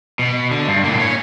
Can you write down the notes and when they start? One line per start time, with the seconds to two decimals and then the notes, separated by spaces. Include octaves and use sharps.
0.19 B2
0.51 D3
0.68 G2
0.84 A2 A#3
1.00 C#4 C#5